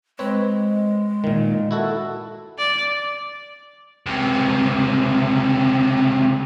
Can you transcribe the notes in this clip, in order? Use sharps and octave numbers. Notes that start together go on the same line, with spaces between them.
G#3 C4 B4 C#5
A#2 D#3
E4 F#4 A4
D5
C#2 C3